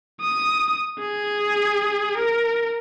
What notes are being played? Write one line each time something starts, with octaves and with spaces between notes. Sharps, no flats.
D#6
G#4
A#4